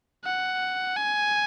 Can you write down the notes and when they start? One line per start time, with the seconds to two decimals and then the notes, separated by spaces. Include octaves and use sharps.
0.25 F#5
0.96 G#5